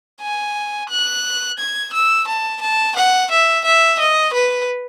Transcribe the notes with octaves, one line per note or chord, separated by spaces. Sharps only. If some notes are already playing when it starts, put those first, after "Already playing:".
G#5
F#6
G#6
E6
A5
A5
F#5
E5
E5
D#5
B4